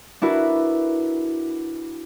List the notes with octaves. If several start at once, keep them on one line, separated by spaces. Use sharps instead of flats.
D4 E4 F#4 A#4 B4